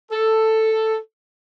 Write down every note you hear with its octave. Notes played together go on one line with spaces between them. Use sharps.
A4